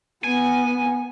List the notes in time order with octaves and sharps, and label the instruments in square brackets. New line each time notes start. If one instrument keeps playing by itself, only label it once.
[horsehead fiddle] B3 [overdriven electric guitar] G#5